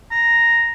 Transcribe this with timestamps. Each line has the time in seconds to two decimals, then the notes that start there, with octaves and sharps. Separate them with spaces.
0.11 A#5